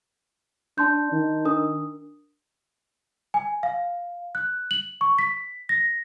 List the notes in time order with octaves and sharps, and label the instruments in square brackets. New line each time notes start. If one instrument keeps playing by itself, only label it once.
[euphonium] D4 [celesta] A5 C6 G6
[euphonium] D#3
[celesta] D4 A#4 D#6
G#5
F5
F#6
F#7
C#6
B6
A#6